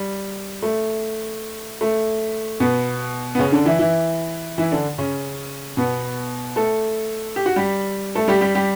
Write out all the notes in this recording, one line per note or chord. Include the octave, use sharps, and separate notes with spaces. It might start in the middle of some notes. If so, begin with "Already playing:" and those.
Already playing: G3
A3
A3
B2 B3
B3
C#3 C#4
D3 D4
E3 E4
E3 E4
E3 E4
D3 D4
C#3 C#4
B2 B3
A3 A4
G4
F#4
G3 G4
A3 A4
G3 G4
G3 G4
G3 G4